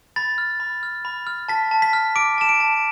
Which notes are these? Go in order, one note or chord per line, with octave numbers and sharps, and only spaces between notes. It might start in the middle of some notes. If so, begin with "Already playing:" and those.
B5 A6
F6
B5
F6
B5
F6
A5 B6
A5
B6
F6
D6 D7
A5 E7
D7
A5